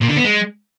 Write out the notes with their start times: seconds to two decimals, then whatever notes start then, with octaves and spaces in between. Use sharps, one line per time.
0.02 A#2
0.09 D3
0.17 B3
0.25 G#3